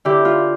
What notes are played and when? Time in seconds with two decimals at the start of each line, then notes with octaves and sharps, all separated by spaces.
0.05 D3 E4 G4
0.25 F4